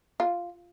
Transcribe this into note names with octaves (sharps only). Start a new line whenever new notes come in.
F4